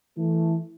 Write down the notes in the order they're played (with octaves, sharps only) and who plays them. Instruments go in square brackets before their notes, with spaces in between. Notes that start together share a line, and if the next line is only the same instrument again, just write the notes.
[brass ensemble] E3 A3